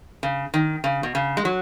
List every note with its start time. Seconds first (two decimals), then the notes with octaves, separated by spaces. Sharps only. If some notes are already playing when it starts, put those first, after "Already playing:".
0.23 C#3
0.54 D#3
0.84 C#3
1.03 B2
1.15 C#3
1.37 G#3
1.45 F#3